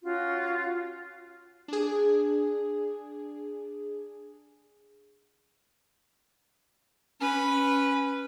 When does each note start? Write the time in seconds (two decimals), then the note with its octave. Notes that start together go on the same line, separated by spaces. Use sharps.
0.03 C#4 F4 F#4
1.68 D4 G#4
7.21 C#4 B4